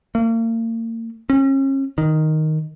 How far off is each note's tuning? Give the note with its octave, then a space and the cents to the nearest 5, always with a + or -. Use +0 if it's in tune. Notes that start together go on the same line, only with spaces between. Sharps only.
A#3 -40
C#4 -35
D#3 +0